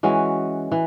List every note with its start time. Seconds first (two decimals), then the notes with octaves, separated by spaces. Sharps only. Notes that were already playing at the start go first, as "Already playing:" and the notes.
0.03 E3 G#3 C#4 F#4
0.72 E3